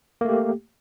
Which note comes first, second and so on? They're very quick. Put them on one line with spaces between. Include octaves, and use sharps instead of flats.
A#3 A3 G4